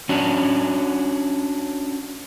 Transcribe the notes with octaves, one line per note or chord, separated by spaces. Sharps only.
C#4 D4 F#4